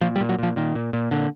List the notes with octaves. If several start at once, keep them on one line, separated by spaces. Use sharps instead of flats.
A#2 F3
G3
A#2
F#3
A#2 F3
A#2 D#3
A#2
A#2
A#2 D3